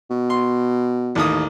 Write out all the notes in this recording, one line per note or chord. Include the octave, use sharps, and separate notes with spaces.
B2
C6
A1 D#2 D#6